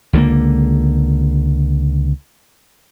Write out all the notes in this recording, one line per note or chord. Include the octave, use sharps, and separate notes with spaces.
C#2 D3 F#3 A#3